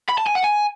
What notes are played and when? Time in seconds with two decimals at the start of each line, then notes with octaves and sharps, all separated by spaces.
0.09 B5
0.18 A5
0.27 G#5
0.35 F#5
0.44 G#5